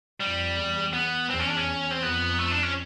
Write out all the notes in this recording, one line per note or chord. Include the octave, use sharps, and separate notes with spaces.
F2 G3
E2
B3
E2 C4
C#4
D4
C#4
E2
C4
F2 B3
A3
D4
C#4